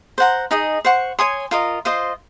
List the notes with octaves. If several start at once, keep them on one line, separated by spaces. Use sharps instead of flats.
C5 F#5 A#5
D#4 G#4 D#5
C5 F#5 C#6
C#5 G#5 C6 D#6
F4 A#4 D#5
F4 C5 D#5